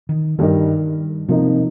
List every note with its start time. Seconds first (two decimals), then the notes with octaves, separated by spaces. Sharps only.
0.09 D#3
0.39 G2 D#3 G3 D#4 A#4
1.28 C3 F3 A#3 D#4